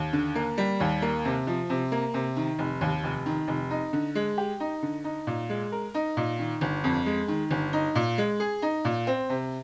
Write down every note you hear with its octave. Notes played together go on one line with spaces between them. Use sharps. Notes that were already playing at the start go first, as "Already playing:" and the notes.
Already playing: D#2
D3
A#3
G3
D#2
A#3
C3
F3
C3
A#3
C3
D#3
F1
D#2
F1
D#3
F1
D#4
D3
G#3
G4
D#4
D3
D#4
A#2
G#3
A#4
D#4
A#2
D#3
G1
F2
G#3
D#3
G1
D#4
A#2
G#3
G#4
D#4
A#2
C4
C3